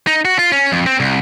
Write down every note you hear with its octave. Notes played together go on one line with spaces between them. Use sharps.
D#4
F#4
F4
C#4
F2
C4
C2